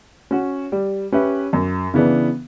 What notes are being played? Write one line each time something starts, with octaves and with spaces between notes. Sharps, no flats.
C#4 F#4
G3
C#4 G4 B4 E5
F#2
C#3 E3 B3 D4